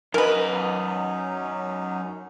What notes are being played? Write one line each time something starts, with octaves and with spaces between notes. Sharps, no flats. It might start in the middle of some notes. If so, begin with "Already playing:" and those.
F#2 F#3 C#4 D#4 A#4 B4 D#5